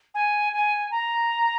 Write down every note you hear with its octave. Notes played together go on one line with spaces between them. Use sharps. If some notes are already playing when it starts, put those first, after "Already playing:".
G#5
G#5
A#5